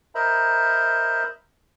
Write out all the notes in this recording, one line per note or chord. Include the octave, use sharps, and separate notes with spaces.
A#4 C5 D#5 E5 A#5 B5